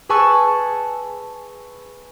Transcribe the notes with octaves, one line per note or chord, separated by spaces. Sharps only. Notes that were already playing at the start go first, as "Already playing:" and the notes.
G#4 B4 G#5 A5 C#6 E6